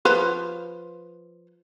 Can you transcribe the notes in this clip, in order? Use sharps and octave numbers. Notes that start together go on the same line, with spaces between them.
F3 B4 F5